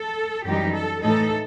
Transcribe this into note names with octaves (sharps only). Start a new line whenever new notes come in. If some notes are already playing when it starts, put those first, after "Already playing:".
Already playing: A4
F#2 E3 G3 D#4 G4
A4
A2 E3 A3 D#4 A4